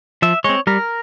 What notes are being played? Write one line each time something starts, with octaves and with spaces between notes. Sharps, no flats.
F3 E5
G#3 C4 C#5
G3 A#4